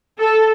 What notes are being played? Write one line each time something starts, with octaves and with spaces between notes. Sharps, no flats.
A4